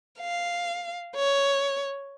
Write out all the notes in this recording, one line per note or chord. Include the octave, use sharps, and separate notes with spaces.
F5
C#5